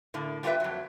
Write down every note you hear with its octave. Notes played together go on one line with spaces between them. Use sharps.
A2 D3 A#3
G3 A#3 F4 G4 B4 E5
F2 F#3